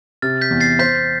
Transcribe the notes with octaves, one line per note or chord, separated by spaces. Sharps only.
C3 F6 A6
G6 B6
E2
A6 C7
C5 G6 B6